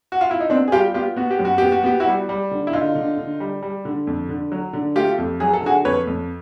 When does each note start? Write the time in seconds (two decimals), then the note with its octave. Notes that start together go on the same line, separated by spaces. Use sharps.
0.12 F#4
0.21 F4
0.31 E4
0.40 D#4
0.50 B3 C4 D4
0.68 G#4
0.72 G3 F4 G4
0.94 B3 F4 G4
1.16 B3 F#4
1.31 G4
1.39 F#2
1.45 F#4
1.58 B3 G4
1.72 F#4
1.83 B3 G4
2.00 E4 F#4
2.06 G3
2.29 G3
2.51 D3
2.67 E4
2.73 D3 D#4 F4
2.95 D3
3.18 D3
3.40 G3
3.63 G3
3.85 D3
4.07 F2
4.29 D3
4.52 F#3
4.73 D3
4.96 A3 F4 G4
5.18 F2
5.40 F#3 G#4
5.53 A4
5.62 D3 F#4 G#4
5.85 F2 B4 C#5
6.07 F2